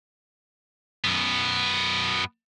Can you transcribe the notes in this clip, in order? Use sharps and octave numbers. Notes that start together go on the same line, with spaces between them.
F#2 B3